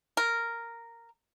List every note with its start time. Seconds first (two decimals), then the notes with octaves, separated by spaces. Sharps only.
0.17 A#4